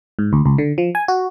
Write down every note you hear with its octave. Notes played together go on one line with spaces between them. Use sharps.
G#2
D2
C#2
D3
F3
G#5
F#4